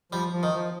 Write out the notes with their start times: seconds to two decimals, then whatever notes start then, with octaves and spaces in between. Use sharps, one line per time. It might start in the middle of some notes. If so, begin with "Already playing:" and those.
0.12 F3 G3
0.33 F3
0.43 D#3
0.53 F3